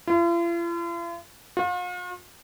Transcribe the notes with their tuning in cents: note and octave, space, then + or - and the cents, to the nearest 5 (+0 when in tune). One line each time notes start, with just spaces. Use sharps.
F4 -45
F4 +45